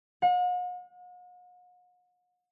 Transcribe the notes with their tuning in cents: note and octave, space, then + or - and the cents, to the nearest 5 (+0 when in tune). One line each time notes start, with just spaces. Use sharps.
F#5 -45